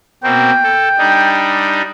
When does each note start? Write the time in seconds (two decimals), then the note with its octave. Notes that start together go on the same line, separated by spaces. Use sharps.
0.24 B2 A#3 C4 G5
0.63 A4
0.98 G3 D4 D#4